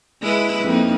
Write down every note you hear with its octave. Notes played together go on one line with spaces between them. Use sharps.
G#3 E4 B4
F2 A#3 D#4